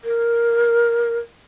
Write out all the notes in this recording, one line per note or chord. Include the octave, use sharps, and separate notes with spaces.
A#4